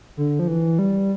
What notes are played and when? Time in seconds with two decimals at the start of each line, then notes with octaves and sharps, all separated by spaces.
0.17 D3
0.39 F3
0.48 E3
0.79 G3